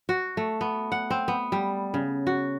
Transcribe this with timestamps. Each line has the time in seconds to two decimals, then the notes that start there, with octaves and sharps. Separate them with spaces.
0.09 F#4
0.37 A3
0.61 B3
0.92 F#5
1.10 C4
1.28 B3
1.52 G3
1.94 C#3
2.27 F#4